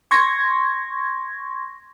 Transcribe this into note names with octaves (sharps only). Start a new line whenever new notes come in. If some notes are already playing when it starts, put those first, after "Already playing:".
C6 C#6 G#6 A#6